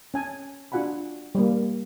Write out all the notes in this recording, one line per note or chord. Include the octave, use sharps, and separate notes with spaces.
C#4 G#5 A5
D4 F4 F#4 F#5 G#5 B5
G3 A#3